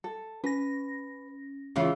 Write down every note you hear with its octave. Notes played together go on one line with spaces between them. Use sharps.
A4
C#4 B4 A#6
C#3 E3 C#4 F4